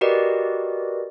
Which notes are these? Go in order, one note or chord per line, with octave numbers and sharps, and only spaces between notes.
F#4 G4 A#4 B4 D5 D#5